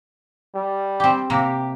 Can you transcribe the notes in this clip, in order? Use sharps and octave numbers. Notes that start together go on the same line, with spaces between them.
G3
C4 G4
C3 A#3 G4